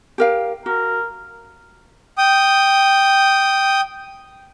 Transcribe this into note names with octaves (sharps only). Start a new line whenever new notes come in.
G4 A#4 F5
F#4 A#4
G5 D#6